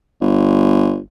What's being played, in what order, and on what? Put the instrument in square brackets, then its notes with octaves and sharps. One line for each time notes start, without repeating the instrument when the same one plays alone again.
[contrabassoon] G1